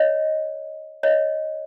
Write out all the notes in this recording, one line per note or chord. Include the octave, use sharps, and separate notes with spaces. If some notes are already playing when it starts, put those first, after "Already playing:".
Already playing: C#5 D#5
C#5 D#5